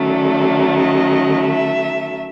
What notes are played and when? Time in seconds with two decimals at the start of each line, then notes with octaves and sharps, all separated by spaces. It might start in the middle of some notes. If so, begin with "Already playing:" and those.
Already playing: D#3 F#3 A3 C#4
0.09 D5
0.77 D#5
1.46 E5